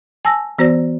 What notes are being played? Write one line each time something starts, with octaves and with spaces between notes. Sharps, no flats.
G#5 A5 E6 A#6
E3 B3 F#4 C5 D5 A#6